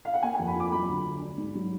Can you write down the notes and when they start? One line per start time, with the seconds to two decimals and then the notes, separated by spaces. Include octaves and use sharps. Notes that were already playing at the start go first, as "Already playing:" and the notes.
0.05 F5
0.14 F#5
0.23 A#3 G#5
0.35 F2 G#5
0.48 B5
0.56 F3 D6
0.72 F#3 B5
0.88 D2
1.06 D3
1.21 D4
1.38 G#2
1.55 F#3